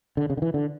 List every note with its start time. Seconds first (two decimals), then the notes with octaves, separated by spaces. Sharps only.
0.17 D3
0.30 C#3
0.37 D3
0.42 E3
0.54 D3